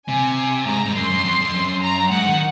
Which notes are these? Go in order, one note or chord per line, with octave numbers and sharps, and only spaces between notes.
C3 G#5
G#2 A#5
G#2
F#2 C6
F#2
F2
F2
F#2
A#5
G#2 F#5
D#3